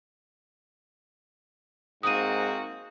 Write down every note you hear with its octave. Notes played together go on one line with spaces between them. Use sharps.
G#2 A#3 C4 F#4 D#6 D#7